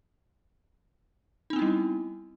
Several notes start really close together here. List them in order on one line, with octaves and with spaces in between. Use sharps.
D#4 C4 B3 E4 G3